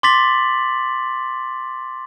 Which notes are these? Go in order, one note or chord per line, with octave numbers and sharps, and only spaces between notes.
C6 D6 A6 B6 F#7